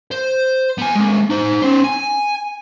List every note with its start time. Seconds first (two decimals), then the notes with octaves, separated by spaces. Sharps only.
0.11 C5
0.78 B3 G#5
0.95 G#3 A#3
1.30 D#4 C5
1.62 C#4 C5
1.84 G#5